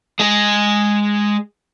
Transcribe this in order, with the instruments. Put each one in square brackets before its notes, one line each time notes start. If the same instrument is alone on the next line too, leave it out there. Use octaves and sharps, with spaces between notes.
[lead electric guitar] G#3 G#4